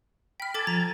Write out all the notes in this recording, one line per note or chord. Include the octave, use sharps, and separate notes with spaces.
G5 B5 F6
A4 G#5 A5 D6 A6
F3 A#5